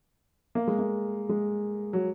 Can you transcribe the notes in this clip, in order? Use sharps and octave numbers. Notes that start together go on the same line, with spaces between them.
A#3
G#3
A#3
G#3
F#3